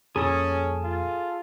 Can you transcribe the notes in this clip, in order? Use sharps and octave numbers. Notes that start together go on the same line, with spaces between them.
F2 A#2 C#4 G#4 A4 D#6
F4